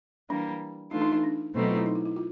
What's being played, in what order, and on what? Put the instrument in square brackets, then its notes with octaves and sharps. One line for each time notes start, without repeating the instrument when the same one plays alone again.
[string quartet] E3 G3 A#3 [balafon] D4
[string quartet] E3 A3 D4 F4 [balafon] D#4
[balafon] D#4
D#4
D4
[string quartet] B2 F#3 A3 C4 D#4
[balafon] F4
E4
D#4
E4
E4
F4